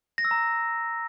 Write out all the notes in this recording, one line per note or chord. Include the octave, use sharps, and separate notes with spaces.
A#6
E6
A#5